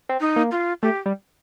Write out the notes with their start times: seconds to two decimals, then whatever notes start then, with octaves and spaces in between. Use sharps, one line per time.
0.09 C4
0.21 D#4
0.36 A#3
0.51 F4
0.83 A3 G4
1.06 G3